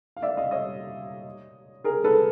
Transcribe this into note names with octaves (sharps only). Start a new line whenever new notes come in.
F5
D5 E5
D#5 F5
C#5 D#5
G#4 A#4
A4 B4